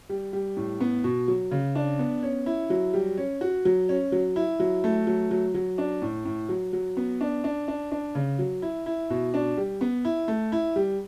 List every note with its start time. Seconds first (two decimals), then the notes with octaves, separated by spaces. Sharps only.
0.09 G3
0.33 G3
0.57 A2
0.80 B3
1.04 B2
1.28 F#3
1.51 C#3
1.75 D4
1.99 B3
2.23 C#4
2.46 E4
2.70 F#3
2.94 G3
3.18 C#4
3.41 F#4
3.65 F#3
3.89 C#4
4.12 F#3
4.36 E4
4.60 F#3
4.84 A3
5.07 F#3
5.31 F#3
5.54 F#3
5.78 D4
6.02 A2
6.25 A2
6.49 F#3
6.73 F#3
6.97 B3
7.21 D4
7.44 D4
7.68 D4
7.91 D4
8.15 C#3
8.39 F#3
8.62 E4
8.86 E4
9.10 B2
9.34 D4
9.57 G3
9.81 B3
10.05 E4
10.28 A3
10.52 E4
10.76 G3